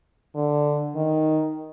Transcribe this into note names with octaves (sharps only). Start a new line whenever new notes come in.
D3
D#3